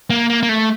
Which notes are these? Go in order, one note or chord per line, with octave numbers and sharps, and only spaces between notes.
A#3
A#3
A#3
A3